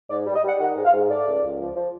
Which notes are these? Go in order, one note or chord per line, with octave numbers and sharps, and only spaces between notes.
G#2 D5
G3
D#5
G3 F#5
D#3 F#5
G#2
F5
G#2
A3 D5
C#2
C#2
F3
F3